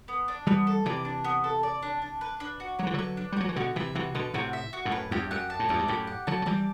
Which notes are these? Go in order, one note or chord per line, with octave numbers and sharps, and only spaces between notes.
B3
D4
E3 G3 B3
A4
C3 E3 D5
D4
B3
A4
D5
D4
D4
B4
D4
F#4
F#3 D4
E3
D3 F#3 B4
D4
G3
F#3 F#4
E3
B2 D3 F#4
C3 E3 E5
C3 E3 F#4
B2 D3 B4
A2 C3 F#4
E5
F#4
F#2 A2
B4
E2 G2 G4
F#2 F#5
A5
A2
E2 G2 D5
G2
F#2 A2 G4
F#5
D3 F#3 A5
F#3
E3 G3 D5